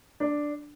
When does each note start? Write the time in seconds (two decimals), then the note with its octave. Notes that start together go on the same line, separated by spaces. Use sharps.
0.20 D4